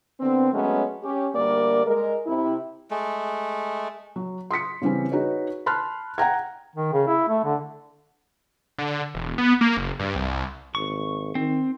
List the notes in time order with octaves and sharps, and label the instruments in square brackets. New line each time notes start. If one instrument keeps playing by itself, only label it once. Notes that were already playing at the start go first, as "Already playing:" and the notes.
[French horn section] D3 B3 C4
F#3 G#3 A3 B3 C#4
C#4 G4
D2 G3 A#3 A#4 D5
G#3 A#4
C3 E4
[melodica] G#3 A3
[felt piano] F#3
C6 D#6 B6 C#7
C#3 E3 G3 C4 C#4
D#4 F#4 G#4 B4 C#5
A5 B5 C6 F6 F#6
F#5 G5 A#5 G#6
[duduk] D#3
C#3
E4
A3
D3
[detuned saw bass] D3
E1
B3
A#3
F#1
G2
C2
[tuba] G#1 [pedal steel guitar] C#6
[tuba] D#3 [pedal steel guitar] C4